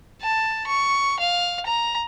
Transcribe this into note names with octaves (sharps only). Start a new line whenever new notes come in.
A5
C#6
F5
A#5